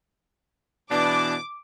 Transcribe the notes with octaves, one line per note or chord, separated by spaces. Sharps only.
B2 E3 D4 D6